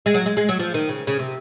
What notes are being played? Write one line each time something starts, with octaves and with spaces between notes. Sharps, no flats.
G#3
F#3
G#3
G#3
F#3
F3
D#3
C#3
C#3
C3